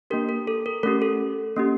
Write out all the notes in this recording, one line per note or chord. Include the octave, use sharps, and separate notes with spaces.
A#3 D4 G4 A#4
A#4
A4
A#4
A3 C#4 G4 A#4
A4
A#3 C#4 G4